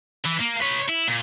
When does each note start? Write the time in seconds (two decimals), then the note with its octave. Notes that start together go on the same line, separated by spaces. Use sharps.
0.25 E3
0.40 A#3
0.61 B4 C#5
0.88 E4
1.07 A#2